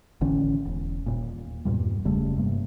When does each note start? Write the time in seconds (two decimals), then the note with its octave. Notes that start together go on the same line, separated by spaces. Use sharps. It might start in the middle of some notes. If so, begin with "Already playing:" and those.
0.21 A1 D3 E3 C#4
0.65 E1
1.06 D#1 A#2
1.65 E2 G2 A#2 G3
2.05 F#1 C#3 G3 A3
2.37 G2 C3 A#3